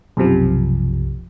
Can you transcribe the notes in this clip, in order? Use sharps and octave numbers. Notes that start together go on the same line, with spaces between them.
B1 F#2 C3 F3